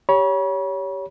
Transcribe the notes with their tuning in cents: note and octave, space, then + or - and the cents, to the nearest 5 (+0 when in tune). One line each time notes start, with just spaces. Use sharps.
G4 +0 C#5 +20 B5 -40